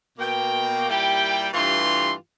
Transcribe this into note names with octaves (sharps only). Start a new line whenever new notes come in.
B2 A#3 G5
A#2 G3 E4 G4 G5
G2 E3 A3 F4 G4 C6